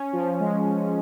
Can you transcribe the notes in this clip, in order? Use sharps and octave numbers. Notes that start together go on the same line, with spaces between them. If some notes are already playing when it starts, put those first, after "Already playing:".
Already playing: C#4
F3
G#3